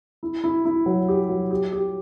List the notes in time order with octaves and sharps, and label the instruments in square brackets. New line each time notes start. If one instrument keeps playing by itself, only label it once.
[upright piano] E4
E4
E4
F#3
G4
F#3
G4
G4